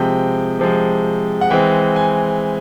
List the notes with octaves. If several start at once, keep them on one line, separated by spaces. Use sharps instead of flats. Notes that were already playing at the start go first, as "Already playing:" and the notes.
Already playing: C3 F3 G#3 G5
C3 F3 G#3
F#5
E3 G#3 C4 G5
G#5